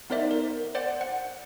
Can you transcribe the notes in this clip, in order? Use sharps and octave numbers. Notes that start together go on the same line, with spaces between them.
B3 D#4 A#4 C5 D5 E5
A#4
C5 D5 F#5
F#5